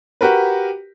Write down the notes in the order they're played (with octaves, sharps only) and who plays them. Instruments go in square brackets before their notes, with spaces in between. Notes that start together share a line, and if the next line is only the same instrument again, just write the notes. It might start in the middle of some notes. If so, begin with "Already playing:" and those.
[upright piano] F#4 G4 A#4 B4